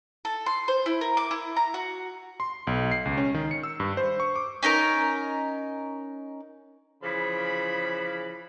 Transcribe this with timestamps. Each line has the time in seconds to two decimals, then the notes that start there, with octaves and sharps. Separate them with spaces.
0.25 A4
0.46 C6
0.68 C5
0.86 E4
1.01 A#4
1.17 D6
1.31 E4
1.57 A#5
1.74 F#4
2.40 C6
2.67 B1
2.91 C7
3.05 C#2
3.17 C#4
3.34 D#3
3.51 C#7
3.63 E6
3.80 G2
3.97 C5
4.20 C#6
4.36 D6
4.63 C#4 D#4 A4 A#4
7.03 C#3 E3 F3 B5